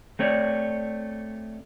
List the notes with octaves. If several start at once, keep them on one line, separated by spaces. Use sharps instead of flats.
A3 C4 C#5 D5